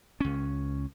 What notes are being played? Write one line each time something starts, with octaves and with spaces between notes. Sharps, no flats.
C#2 C#4